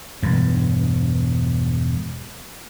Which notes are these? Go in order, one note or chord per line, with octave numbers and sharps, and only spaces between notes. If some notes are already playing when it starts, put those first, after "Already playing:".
E1 G2